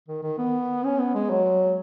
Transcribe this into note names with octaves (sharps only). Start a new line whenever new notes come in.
D#3
D#3
B3
C#4
B3
G#3
F#3